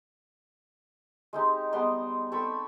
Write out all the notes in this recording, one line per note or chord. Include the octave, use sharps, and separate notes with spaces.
G#3 C4 D#4 G4
G3 G#3 B3 C6
C4 A4 B5 C#6